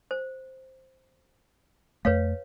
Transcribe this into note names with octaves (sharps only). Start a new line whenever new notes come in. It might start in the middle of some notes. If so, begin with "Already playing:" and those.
C5
F2 A3 B4 C#5 F5